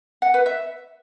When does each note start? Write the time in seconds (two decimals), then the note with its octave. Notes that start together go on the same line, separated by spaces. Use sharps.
0.22 F#5
0.34 B4
0.46 E5